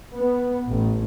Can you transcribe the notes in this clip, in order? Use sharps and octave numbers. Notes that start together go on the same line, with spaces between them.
B3
A1